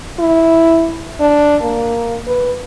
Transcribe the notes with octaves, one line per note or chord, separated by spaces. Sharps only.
E4
D4
A#3
B4